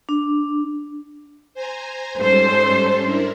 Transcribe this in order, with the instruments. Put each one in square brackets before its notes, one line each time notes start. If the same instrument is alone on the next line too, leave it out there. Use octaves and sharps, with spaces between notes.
[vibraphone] D4
[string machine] C5 G#5 A#5
[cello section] G#2 C5 [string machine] G3 C#4 A4
[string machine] D4 E4 A#4